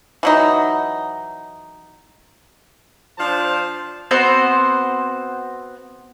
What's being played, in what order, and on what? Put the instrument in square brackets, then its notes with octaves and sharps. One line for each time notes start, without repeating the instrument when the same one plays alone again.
[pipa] E3 F#3 D#4
[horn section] F3 D4 F4 C5 A5
[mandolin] B3 C4 F#4 C5